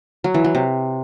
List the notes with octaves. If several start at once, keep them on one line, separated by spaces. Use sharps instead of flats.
F#3
E3
F#3
C3